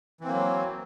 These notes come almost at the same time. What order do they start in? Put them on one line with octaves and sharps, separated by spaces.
E3 C4 A#3 F#3